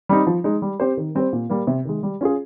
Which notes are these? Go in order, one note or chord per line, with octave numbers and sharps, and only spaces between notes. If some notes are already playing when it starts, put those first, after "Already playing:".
G3 C4 D#4
F3
G#3 D#4
G3
C4 G4 C5
D#3
G3 C4 G4 C5
A#2
G3 A#3
C3
D#3 G#3
G3
C#4 F4 G#4